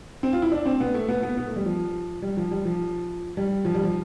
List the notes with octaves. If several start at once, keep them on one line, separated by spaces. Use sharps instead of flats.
C4
F4
E4
D4
C4
B3
A3
B3
B3
B3
A3
G3
F3
G3
F3
G3
F3
G3
F3
G3
F3